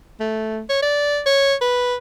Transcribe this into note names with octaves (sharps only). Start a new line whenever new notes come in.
A3
C#5
D5
C#5
B4